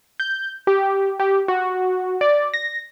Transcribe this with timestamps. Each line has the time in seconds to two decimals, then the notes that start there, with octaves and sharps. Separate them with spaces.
0.20 G6
0.67 G4
1.20 G4
1.48 F#4
2.21 D5
2.54 A#6